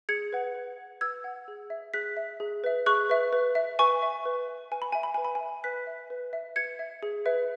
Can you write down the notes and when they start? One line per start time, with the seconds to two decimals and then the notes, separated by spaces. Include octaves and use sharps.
0.09 G#4 G#6 C#7
0.33 B4 F#5
0.54 B4
0.78 F#5
1.01 B4 E6 G#6
1.24 F#5
1.48 G#4
1.70 E5
1.94 G#4 F#6 B6
2.17 E5
2.40 G#4
2.64 B4 E5
2.86 G#4 C#6 F#6
3.10 B4 E5
3.33 B4
3.55 E5
3.79 B4 G#5 C#6
4.02 E5
4.25 B4
4.48 E5
4.71 B4 G#5
4.82 B5
4.93 E5 G#5
5.03 B5
5.14 B4 G#5
5.25 B5
5.35 G#5
5.40 E5
5.64 B4 F#6 B6
5.87 E5
6.10 B4
6.33 E5
6.56 B4 G#6 C#7
6.79 E5
7.03 G#4
7.26 B4 E5